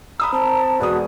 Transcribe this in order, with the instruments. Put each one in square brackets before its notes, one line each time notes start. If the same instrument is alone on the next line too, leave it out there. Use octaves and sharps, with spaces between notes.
[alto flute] A#5 [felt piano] B5 D#6 E6
[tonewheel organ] C4 [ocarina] A5
[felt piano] E1 D#6 [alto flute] F#4 [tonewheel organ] B4 [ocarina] D5